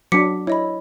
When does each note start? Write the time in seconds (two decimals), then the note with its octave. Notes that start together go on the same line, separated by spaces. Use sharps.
0.12 F#3 D4 D6 B6 C#7
0.47 E4 C#5 D#5 B5